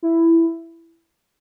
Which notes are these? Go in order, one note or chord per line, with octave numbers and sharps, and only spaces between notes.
E4